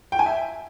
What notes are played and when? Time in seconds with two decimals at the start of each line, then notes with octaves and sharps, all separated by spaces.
0.12 G5
0.19 G#5
0.26 E5